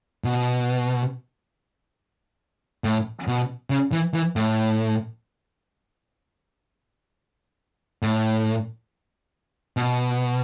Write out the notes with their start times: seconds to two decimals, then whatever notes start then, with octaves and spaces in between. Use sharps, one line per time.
0.24 B2
2.84 A2
3.28 B2
3.70 C#3
3.92 E3
4.14 E3
4.36 A2
8.02 A2
9.77 B2